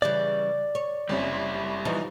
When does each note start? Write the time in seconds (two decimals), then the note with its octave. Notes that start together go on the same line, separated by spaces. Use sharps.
0.02 C#3 E3 G3 D5
0.75 C#5
1.09 F#1 F2 G3 C#4 E4
1.85 E3 F3 D#4